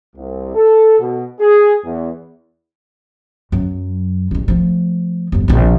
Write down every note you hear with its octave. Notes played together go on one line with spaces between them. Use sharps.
C2
A4
B2
G#4
E2
F#2 F#3
A1 G#3
F3 A3
G1 F2
A#1 C3